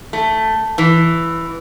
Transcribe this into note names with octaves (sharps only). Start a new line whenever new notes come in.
A3
E3